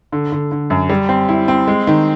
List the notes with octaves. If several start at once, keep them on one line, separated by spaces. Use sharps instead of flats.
D3
D3
D3
F#2
G3
C4
E4
C4
G#3
D#3